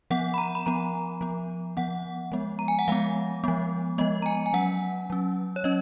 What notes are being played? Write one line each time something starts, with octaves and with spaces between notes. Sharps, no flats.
F3 B3 F#5
B5
A#5
B5
F3 B3 A#5
F3 B3
F3 B3 F#5
F3 G#3 B3
A#5
G#5
F#5
F3 G#3 B3 F5
F3 G#3 B3
F3 G#3 B3 D#5
A#5
G#5
G#5
F#3 C#4 F#5
F#3 C#4
C#5
F#3 C#4 D#5